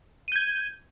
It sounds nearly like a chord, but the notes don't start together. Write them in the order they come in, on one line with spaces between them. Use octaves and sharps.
D#7 G6 G#6